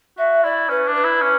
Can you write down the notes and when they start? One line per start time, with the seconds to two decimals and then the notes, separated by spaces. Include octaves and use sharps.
0.18 F#4 E5
0.44 E4 D5
0.69 C#4 B4
0.87 D4
0.95 B4
1.04 E4
1.21 C#4